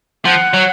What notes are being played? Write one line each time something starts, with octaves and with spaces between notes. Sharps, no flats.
F3 F#5
F#3